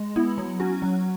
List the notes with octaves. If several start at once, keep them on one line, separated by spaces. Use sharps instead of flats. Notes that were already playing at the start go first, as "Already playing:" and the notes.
Already playing: G#3
B3 E4
F#3
C#4 F#4
F#3